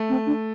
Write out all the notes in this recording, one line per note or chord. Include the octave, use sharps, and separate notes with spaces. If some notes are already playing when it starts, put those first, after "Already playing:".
Already playing: A3
C4
D4